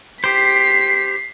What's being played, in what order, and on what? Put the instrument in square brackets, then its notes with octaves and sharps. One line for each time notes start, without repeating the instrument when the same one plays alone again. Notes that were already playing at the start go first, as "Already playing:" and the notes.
[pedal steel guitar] G4 C5 [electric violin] B6 C7